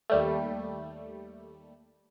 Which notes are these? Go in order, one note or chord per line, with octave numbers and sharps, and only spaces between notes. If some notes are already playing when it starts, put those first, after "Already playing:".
D#2 G3 A3